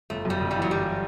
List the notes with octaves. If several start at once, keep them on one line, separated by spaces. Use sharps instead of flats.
G1 A3
F#2 G3
G1
G3
E3
F#3
G1 G3